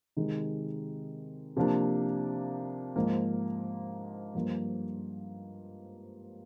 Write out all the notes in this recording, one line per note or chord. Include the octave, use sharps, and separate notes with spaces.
C3 D#3 G#3 D#4
C3 F3 A#3 D4
G#2 F3 A#3
G2 F3 A#3